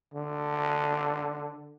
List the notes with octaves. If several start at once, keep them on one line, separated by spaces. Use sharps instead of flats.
D3